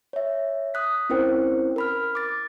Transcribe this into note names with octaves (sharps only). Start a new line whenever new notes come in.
C#5 E5
D#6 F#6 B6
C4 C#4 E4 A#4 C5 G5
A#4 B5 F6
D6 A6